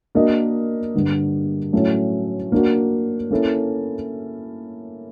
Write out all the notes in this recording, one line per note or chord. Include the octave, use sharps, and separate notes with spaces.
A#3 D4 F#4 A#4 D#5
G2 D3 G3
A2 F#3 A3 C#4
A#3 D4 F#4
A#3 C#4 E4 A4